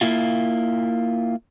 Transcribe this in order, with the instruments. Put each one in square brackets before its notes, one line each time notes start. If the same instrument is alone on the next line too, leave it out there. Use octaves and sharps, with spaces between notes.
[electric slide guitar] A#3 E4 F4